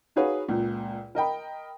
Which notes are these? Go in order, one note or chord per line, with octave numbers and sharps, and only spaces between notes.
D#4 F#4 G#4 B4 C#5 F5
C#2 A#2
A#4 D#5 G5 B5